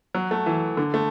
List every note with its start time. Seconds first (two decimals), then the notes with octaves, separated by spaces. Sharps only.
0.15 F#3
0.31 A3
0.46 E3
0.77 D3
0.94 A3